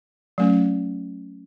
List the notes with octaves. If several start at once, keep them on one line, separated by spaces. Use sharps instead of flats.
F#3 A3 C#4